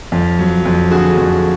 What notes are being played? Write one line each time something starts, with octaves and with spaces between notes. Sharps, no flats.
F2
F#3
F2
D3 F#4 G#4
F2